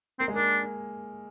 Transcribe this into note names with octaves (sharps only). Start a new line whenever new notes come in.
A#3 C4
G#3
A#3 D4